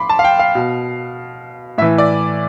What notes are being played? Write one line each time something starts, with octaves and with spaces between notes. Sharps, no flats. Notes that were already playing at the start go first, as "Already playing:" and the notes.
Already playing: B5 C6 D6
A5
F5
G5
F5
B2
A2 E3 E5
D5